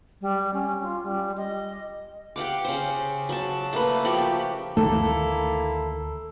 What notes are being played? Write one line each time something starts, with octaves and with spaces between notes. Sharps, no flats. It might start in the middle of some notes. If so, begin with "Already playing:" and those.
G3
C#4
F4
G3
D#5
G4 F5 F#5 D6
C#3 C5
F#3 A5
A3 A#3 B4
F3 F#4 G4
D2 D3 D#3 A3 A#3 E4 A4